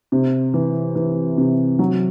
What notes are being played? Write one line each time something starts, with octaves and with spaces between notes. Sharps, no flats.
C3
E3
E3
C3
F#3